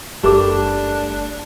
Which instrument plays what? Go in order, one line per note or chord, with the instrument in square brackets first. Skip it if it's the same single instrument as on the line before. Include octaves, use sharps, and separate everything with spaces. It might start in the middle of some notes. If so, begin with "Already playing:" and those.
[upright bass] F#1 [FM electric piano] G3 A3 [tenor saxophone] D4 [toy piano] G4 A#4 D6